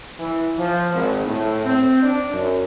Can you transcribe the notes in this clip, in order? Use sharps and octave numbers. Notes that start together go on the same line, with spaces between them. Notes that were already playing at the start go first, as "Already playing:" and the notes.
E3
F3
G#1
A2
C4
D4
F#2